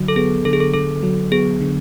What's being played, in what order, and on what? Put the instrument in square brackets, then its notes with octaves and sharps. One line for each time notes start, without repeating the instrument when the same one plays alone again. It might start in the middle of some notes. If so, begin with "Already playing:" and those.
Already playing: [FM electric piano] D3 F#3
[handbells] A4
[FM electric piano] B3 [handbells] G#4
[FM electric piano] D3 [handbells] A4
[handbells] G#4
A4
[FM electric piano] D3 [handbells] A4
[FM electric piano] F#3
[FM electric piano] B3 [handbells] G#4
[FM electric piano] D3